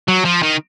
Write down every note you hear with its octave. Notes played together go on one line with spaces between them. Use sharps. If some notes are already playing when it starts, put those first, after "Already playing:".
F#3
F3
D#3